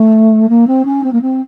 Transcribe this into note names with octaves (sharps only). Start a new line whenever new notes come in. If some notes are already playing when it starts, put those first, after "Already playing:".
Already playing: A3
A#3
C4
C#4
C4
A#3
C4